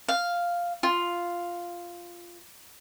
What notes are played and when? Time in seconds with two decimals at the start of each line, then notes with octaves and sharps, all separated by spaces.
0.08 F5
0.83 F4